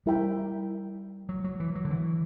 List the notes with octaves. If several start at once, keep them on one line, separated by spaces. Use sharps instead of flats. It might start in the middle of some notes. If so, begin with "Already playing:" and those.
G3 E4 A#4 E5 G5 B5
F#3
F#3
E3
F#3
D3
E3